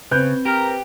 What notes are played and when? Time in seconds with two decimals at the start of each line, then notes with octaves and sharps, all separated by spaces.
0.11 C#3 C4 B4 F#6 G6
0.45 G4 A#4